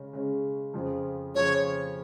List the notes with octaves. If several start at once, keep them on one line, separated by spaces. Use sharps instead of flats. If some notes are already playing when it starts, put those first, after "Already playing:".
Already playing: C#3 G#3 C#4
C#3 G#3 C#4
F2 C#3 F3
F2 C#3 F3 C#5